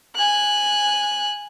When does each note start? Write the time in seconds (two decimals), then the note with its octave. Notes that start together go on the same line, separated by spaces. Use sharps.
0.15 G#5 F#6